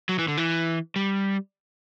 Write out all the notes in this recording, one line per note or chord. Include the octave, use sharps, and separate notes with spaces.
F#3
E3
D3
E3
G3